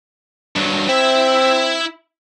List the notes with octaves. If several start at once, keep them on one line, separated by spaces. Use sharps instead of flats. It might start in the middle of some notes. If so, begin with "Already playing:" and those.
G2 F#3
C4 E4 E5